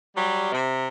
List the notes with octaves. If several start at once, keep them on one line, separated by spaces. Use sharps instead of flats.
F#3 G3
C3